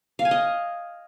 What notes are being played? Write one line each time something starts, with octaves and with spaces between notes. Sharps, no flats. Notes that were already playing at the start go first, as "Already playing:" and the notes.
F5
G#5
D#5